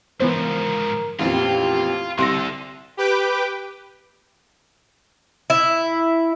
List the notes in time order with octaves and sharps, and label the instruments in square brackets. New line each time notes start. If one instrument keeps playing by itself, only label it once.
[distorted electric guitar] G#2 F3 [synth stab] E3 B3 C5 [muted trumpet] A#4
[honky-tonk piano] A1 F2 A#2 [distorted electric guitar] F4 [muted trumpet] G4
[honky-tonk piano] C2 A#6 [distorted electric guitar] D3 A4 [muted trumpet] C6
[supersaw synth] G4 B4 G5 D6
[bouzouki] E4